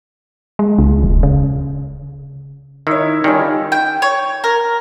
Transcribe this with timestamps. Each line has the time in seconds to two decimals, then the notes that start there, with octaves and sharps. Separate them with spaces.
0.59 G#3
0.78 C#2
1.03 D#1
1.23 C#3
2.87 D#3 E4 C#5
3.24 D#3 G3 C#4 F4
3.72 G5
4.02 C#5
4.44 A#4